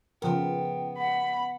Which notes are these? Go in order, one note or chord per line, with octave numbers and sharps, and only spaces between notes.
C#3 F3 B3 A#4 G5
F#5 B5